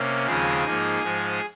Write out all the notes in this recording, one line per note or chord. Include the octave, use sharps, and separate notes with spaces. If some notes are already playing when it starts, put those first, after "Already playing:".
Already playing: C3 A#3 C#4
D#2 C#3 F3 G#3 C4 G#4
G#2 F3 A#3 D#4
G#2 F3 G#3